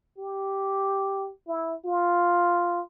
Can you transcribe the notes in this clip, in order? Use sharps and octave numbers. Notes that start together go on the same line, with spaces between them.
G4
E4
F4